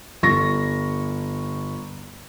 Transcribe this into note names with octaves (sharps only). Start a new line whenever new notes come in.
G1 C#6 A#6